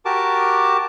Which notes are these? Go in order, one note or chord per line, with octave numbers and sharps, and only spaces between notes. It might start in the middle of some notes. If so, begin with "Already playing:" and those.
F#4 G4 A#4 A5 D6